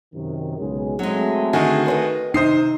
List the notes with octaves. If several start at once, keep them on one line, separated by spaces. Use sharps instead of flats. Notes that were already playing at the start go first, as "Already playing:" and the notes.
F#2 C3 D#3
B1 C#3 G#3
F#3 G#3 A3 C4
D3 D#3 D#4 F#4 G#4 G#5
B4 C5 D#5
C3 D#4 C5 D#6 C7